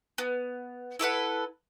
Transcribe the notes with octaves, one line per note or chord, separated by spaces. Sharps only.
B3
E4 A4 B4 F#5